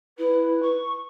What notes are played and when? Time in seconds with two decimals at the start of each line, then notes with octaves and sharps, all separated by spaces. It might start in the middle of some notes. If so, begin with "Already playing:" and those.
0.18 E4 B4
0.63 C#6